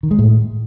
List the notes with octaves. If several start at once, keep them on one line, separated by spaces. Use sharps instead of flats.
D#3
G#3
A2